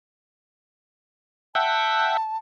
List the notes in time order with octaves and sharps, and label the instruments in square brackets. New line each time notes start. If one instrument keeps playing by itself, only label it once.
[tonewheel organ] E5 F#5 G5 [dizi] A5